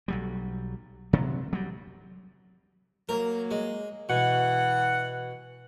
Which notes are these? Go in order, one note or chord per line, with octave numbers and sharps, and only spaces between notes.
B1 F#3 G3
C3 F#3
F#3 G3
F#3 A#3 A#4
G#3
B2 E3 F#5